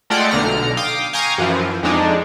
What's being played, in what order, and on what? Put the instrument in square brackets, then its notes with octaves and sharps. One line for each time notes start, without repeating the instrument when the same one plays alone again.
[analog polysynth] G#3 A3 F4 D5 F#5 G5
B1 D3 A#5 F6
F5 G5 D6 D#6
F5 G5 G#5 A#5 C#6 D#6
F#2 E3 F3
F2 G#3 D4 D#4